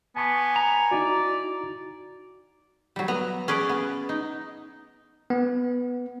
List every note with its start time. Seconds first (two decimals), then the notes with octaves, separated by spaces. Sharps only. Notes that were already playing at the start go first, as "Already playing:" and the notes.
0.17 B3 G#5 A5 C#6 D6
0.56 A#5
0.91 D#4 E4 F#4 D5
2.96 F#3 G3
3.08 B3 A#5
3.48 C#4 G#4 B4 D5
3.69 B3
4.09 D#4
5.30 B3